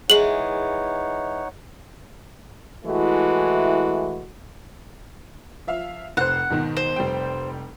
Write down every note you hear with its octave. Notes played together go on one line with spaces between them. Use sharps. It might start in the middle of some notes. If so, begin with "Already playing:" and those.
E3 G#3 D#4 G#4 C#5 F#5 F#7
E3 G#3 A3 E4 F#4
F3 E5 F5
F1 C5 F#5
G#2 B2 D#3
C5
F1 G3 G5